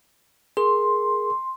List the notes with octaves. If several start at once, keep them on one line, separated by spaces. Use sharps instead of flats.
G#4 A#4 C6